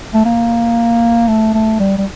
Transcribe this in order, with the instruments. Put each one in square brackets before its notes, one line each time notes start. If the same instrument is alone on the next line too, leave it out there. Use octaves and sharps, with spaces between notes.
[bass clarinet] A3
A#3
A3
A3
G3
G3